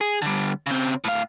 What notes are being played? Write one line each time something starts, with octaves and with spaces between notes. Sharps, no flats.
G#4
D3 G3
C#3 C4
A2 F5